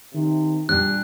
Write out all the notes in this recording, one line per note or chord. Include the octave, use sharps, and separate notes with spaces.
C3 D#3
A#2 G3 D4 G4 F#6